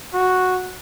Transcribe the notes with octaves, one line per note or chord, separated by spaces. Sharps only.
F#4